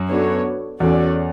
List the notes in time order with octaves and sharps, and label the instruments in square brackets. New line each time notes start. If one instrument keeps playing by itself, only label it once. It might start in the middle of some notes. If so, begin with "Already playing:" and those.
Already playing: [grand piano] F#2
[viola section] B3 D4 F#4 A4 C#5
[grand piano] E2 [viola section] C#4 F#4 A4 D5